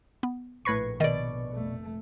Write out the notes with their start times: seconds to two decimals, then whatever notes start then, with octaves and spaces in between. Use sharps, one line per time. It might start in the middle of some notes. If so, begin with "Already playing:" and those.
0.23 B3
0.65 A#1 A2 B4 C#6 G#6 A#6 C7
1.00 B2 D#3 D5 D#5
1.54 F1 A3